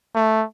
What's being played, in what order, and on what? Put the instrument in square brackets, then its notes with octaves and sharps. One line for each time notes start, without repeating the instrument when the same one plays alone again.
[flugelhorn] A3